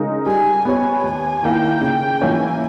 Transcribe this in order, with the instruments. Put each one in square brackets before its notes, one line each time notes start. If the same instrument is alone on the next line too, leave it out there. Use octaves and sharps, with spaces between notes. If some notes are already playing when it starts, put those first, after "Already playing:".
Already playing: [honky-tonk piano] C#3 G#3 D#4 A#4
[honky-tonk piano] G3 [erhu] G#5
[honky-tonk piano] B3 G4 C#5 [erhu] G#5
[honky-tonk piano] D#2 [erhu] G#5
[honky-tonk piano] D#3 A#3 E4 [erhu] G5
[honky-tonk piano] C#3 [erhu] G5
[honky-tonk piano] E3 A#3 C#4 [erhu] G#5